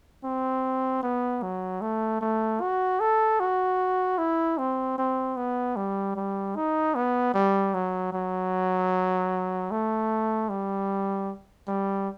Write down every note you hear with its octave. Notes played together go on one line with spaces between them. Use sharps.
C4
B3
F#3
A3
A3
F#4
A4
F#4
E4
C4
C4
B3
G3
G3
D#4
B3
G3
F#3
F#3
A3
G3
G3